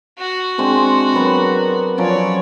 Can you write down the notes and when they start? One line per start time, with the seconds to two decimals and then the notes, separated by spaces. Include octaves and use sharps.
0.18 F#4
0.58 G#3 C4 D4
1.13 F#3 B3 A#4
1.98 F3 F#3 C#4 C#5 D5